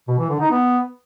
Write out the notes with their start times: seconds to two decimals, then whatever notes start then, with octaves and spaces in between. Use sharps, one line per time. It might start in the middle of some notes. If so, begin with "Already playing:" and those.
0.08 B2
0.19 E3
0.29 D3
0.40 D#4
0.51 B3